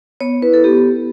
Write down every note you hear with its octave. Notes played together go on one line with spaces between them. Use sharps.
B3 C#5
E4 B4
A4
B3 G4
E4